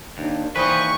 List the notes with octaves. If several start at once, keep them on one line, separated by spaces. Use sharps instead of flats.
D#2 D4
D#2 G#2 E3 G3 B4 C5 D#5 C#6